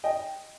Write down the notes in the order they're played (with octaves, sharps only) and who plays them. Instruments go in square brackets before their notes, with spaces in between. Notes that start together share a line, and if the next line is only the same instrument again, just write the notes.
[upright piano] D#5 G5